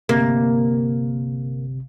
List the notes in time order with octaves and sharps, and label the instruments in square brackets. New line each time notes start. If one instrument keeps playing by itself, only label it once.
[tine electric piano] G1 C3 [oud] A#3